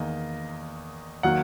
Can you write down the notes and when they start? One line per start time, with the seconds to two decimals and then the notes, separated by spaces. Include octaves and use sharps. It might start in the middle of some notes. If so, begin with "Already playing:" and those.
Already playing: E2 D#3 A#3 D#5
1.23 D#3 F#3 A#3 F#5